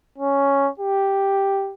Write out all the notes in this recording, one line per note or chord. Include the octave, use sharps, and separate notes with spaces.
C#4
G4